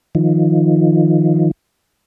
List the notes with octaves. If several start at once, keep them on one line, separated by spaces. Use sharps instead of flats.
D#3 F3